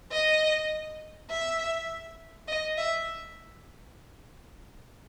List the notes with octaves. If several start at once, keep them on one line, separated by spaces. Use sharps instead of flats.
D#5
E5
D#5
E5